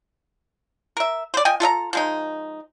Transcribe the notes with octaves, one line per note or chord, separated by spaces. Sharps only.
A#4 E5
C5 D5
F3 D#5 G5 G#5
F4 A4 D#5 A#5
F3 G#3 D#4